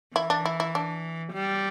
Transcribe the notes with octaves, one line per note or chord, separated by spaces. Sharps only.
E3 E4
D4
E4
E4
D4
G3